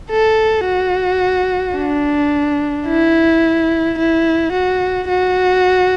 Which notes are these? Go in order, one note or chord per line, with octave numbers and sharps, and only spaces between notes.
A4
F#4
D4
E4
E4
F#4
F#4